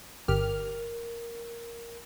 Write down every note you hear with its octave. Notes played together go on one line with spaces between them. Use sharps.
G1 G4 A#4 F6